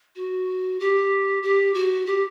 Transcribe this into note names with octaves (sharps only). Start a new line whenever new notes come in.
F#4
G4
G4
F#4
G4